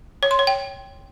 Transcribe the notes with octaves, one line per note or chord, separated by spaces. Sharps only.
C#5
C6
C#5
G5